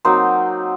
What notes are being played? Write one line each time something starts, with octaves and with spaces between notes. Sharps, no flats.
F#3 A#3 C4 D#4 C5